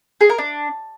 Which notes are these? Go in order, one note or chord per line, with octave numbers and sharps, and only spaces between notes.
G#4
A#4
D4